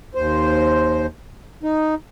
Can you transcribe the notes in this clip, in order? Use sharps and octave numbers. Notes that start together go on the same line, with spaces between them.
D#2 C5
D#4